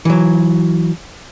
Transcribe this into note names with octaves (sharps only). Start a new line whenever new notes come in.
E3 F#3